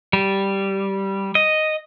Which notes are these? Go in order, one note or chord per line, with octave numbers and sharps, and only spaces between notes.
G3
D#5